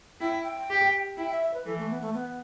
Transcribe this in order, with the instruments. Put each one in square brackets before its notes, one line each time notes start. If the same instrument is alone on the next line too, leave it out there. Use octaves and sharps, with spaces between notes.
[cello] E4 [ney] G5
[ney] G5
[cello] G4
[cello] E4 [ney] G5
[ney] E5
E5
B4
[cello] E3 [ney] A4
[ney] A3
B3
A3
B3